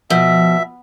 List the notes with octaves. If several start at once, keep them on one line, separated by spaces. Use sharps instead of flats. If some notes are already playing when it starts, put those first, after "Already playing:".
B2 F3 E5